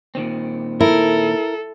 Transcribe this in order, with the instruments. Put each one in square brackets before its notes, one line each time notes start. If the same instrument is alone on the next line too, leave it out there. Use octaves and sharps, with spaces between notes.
[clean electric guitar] A#2 D#3 C4
[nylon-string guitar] E4 [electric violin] A4 [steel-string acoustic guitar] A#4